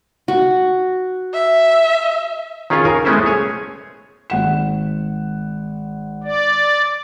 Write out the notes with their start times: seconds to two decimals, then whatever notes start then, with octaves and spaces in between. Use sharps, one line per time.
0.28 F#4
1.34 E5
2.70 D#3 C#4 F4 G#4 C#5
2.85 A#4 G#5
3.05 G#3 A3 B3 C#4 E4 C5
3.25 G#4 C#5 G#5
4.30 G#1 F#5 E7
6.24 D5